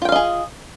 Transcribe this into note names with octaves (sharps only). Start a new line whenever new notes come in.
F4 G#4 D#5 F5 G5